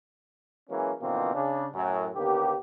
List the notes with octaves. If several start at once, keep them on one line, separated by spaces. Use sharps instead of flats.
E3 F#3 G#3 A#3 C#4
B2 D3 E3 F3 A#3 C4
C#3 D4
F#2 A2 F#3
D#2 D3 A#3 B3 G4